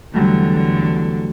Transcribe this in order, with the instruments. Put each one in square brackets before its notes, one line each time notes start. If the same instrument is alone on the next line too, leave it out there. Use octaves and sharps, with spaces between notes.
[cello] E2 D3 [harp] F#3 G3 A3